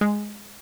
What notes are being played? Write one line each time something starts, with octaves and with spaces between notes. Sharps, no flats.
G#3